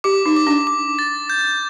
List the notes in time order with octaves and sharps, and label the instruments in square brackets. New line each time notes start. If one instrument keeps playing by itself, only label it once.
[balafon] G4 [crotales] D6
[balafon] D#4
[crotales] D6
[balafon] D4
[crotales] D6
A6
G6